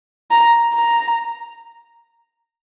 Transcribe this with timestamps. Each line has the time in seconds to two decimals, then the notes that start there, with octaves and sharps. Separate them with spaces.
0.31 A#5
0.73 A#5